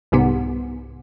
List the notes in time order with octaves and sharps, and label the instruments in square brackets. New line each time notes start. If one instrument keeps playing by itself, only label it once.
[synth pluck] C2 G#2 C3 B3